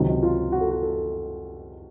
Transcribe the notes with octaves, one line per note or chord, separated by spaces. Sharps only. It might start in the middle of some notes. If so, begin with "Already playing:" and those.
Already playing: C#2 C3 D#3 F#3
D#4
F4
F#4
A4
F#4
A4